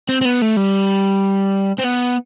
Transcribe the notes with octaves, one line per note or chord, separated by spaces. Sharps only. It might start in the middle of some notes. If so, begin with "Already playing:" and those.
C4
C4
B3
A3
G3
C4
B3